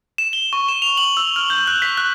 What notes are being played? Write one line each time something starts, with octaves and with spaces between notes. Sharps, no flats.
E7
G7
C#6
E7
F7
F#7
E6
F6
G6
F#6
B6
F#6